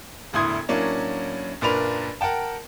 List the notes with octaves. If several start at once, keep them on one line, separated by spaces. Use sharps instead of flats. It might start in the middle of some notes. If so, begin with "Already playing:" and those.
E1 D2 A2 C6 D#6 G#6
A2 F#3 A#3 C#4 D4
F#1 A#2 D4 A#4 B4 F7
A#4 F#5 G5 A5